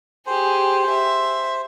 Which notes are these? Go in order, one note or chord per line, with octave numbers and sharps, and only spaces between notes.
G4 G#4 C5
E5